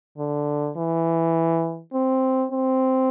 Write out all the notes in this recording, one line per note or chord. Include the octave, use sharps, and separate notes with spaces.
D3
E3
C4
C4